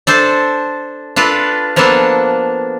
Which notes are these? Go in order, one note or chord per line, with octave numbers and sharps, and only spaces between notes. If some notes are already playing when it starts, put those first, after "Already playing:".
D4 A4 C5
D4 F4 A4 B4
F3 A#3 B3 D4 A4